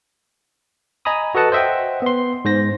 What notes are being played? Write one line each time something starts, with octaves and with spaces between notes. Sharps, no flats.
D#5 G#5 A#5 B5 D#6
F#4 A4 B4 D#5 F#5 A5
C5 D#5 E5 F#5 G5
B3 C6
G#2 C5 A#6